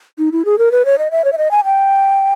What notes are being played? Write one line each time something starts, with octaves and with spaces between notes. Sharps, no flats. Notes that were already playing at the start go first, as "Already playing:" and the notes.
D#4
E4
G#4
A#4
B4
C#5
D#5
E5
C#5
E5
D#5
G#5
G5